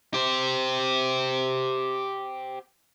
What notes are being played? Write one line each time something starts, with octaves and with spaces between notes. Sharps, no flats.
G4 C5